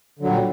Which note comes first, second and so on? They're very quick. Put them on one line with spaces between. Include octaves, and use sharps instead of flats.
D3 F#3 A#2 G3